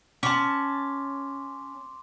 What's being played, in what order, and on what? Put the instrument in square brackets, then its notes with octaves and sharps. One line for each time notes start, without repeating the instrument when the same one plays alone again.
[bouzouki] C#4 A5 [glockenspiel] C6 D6